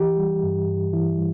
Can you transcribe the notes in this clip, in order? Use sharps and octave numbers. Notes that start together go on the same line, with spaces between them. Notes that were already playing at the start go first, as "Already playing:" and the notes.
Already playing: E3 G4
G3
G2
G2
E3 E4
G3